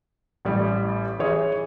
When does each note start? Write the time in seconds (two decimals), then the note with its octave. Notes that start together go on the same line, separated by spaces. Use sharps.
0.45 A1 G3
1.19 E3 G#4 C#5